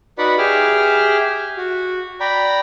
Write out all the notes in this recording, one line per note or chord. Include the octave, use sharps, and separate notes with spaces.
D#4 F#4 B4 D5 F#5 B5
G4 G#4 E5 D6 F6
F#4
D5 G5 A#5 B5